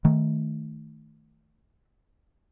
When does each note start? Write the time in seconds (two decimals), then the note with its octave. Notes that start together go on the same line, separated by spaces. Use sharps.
0.05 D#3 A3